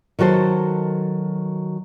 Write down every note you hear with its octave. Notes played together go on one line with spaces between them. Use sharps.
D#3 F#3 F#4 A4 C5